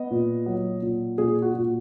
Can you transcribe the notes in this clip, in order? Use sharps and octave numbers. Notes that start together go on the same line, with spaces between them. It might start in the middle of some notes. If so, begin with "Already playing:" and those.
Already playing: B3 D#5
A#2
F#3
A#2
A#2 G#4
F#4
A#2